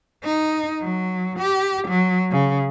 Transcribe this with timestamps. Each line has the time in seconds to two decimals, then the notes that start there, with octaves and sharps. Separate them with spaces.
0.24 D#4
0.82 F#3
1.39 G4
1.88 F#3
2.31 C#3